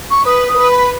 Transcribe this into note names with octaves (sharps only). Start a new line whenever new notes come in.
C#6
B4 D#6
D#6
B4
B5